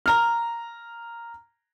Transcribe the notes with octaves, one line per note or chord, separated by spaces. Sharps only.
A#5 F6